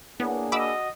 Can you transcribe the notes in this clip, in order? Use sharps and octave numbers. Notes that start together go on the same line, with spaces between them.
A#3 B3 D4 E4 G#4 C#5 F#5
F#4 D#5 F#5 B5 D6 E6